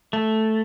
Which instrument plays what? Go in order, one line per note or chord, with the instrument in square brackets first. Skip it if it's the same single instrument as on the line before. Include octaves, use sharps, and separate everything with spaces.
[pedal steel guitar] A3